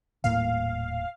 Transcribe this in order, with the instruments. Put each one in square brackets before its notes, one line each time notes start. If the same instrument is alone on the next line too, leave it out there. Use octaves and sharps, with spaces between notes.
[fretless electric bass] D#1 A2 A#3 [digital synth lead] F5